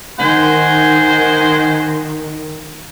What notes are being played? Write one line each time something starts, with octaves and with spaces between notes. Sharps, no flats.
D#3 C5 F#5 G#5